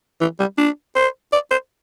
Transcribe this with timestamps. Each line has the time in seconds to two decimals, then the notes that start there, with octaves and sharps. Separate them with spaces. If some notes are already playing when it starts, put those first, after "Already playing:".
0.21 E3
0.40 G3
0.58 D4
0.96 C5
1.33 D5
1.51 C5